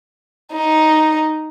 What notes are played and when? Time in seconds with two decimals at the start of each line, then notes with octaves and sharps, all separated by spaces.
0.53 D#4